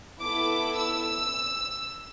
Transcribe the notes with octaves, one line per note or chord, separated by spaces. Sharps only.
B3 E4 A4 D6
E6